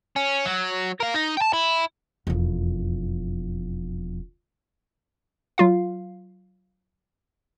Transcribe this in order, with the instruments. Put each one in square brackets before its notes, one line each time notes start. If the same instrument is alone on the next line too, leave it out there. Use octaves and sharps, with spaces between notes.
[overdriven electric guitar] C#4
F#3
A#4 F5
D#4
G5 A5
E4
[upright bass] E1 F2
[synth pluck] F#3 F4 F5